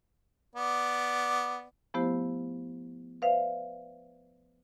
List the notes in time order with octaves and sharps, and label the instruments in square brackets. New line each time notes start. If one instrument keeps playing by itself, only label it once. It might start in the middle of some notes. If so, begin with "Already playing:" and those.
[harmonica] B3 D5
[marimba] F3 A3 B3 E4 G4 C5
B4 C5 D5 E5 F5